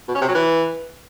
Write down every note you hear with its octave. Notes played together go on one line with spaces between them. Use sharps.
B2
C#4
C3
F#3
E3